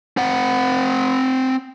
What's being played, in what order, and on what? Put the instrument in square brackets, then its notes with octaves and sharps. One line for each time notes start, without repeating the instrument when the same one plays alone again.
[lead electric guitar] C4 F#5